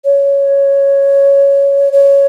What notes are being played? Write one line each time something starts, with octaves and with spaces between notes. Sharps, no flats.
C#5
C#5